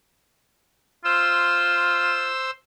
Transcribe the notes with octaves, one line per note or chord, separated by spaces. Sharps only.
F4 C5 E6